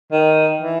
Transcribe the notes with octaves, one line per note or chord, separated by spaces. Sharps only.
D#3
E3